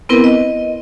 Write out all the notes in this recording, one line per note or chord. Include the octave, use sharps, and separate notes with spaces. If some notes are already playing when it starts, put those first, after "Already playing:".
B3 C4 E4 A#4 B4
D#5